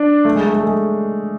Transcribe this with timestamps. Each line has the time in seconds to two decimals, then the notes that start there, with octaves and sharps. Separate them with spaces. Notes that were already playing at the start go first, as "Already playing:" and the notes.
Already playing: D4
0.25 A3
0.36 G#3
0.46 A3
0.56 A3
0.67 G#3